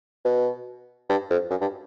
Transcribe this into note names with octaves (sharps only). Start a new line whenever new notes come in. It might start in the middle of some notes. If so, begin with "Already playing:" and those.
B2
G2
F2
F#2
G2